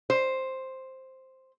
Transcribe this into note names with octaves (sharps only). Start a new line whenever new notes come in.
C5